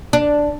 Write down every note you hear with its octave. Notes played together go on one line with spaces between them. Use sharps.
D4